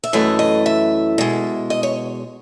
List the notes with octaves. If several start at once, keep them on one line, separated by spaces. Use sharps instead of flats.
E5
F#2 E3 A3 D#5
D#5
E5
B2 G#3
D#5
C#5